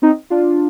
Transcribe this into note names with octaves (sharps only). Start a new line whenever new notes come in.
C4 D#4
D4 F4